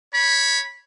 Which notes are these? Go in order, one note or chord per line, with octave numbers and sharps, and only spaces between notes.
C#5 B5